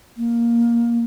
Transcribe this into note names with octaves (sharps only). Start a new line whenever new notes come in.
A#3